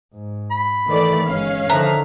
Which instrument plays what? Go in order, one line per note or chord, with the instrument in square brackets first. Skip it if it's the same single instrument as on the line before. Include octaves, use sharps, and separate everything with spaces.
[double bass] G#2
[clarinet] B5
[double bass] D#3 E3 [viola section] A3 D5
[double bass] G1 G#3 [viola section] C#4 F5
[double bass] D3 D#3 [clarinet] F3 [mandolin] E5 A#5 F#6